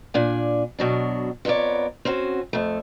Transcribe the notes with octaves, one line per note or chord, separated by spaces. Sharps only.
A#2 D4 G#5
B2 F#3 D4
F2 B3 A#4 C#5 D5
C4 C#4 F#4
F2 A3